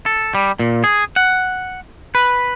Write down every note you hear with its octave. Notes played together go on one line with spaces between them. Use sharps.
A4
G3
A#2
G#4
F#5
B4